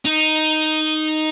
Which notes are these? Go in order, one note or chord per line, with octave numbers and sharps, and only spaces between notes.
D#4